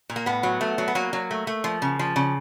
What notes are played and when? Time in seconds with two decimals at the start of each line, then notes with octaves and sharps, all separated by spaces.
0.09 A#2
0.16 A#3
0.26 A2 B3
0.43 F#3
0.61 A3
0.78 F#3
0.88 B3
0.95 F#3 A#3
1.13 F#3
1.31 A3
1.47 A3
1.64 F3
1.82 C#3
1.99 F3
2.16 C#3